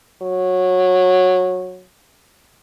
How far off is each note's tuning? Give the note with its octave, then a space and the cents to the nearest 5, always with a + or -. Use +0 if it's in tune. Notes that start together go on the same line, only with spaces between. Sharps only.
F#3 -15